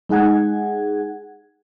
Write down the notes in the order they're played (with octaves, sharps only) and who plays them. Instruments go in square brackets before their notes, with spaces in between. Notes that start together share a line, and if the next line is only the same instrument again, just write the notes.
[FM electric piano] G#3 D#4 G#4 F#5 G#6